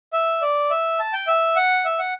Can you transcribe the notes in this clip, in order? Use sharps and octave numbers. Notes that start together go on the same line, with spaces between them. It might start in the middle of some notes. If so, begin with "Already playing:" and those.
E5
D5
E5
A5
G5
E5
F#5
E5
F#5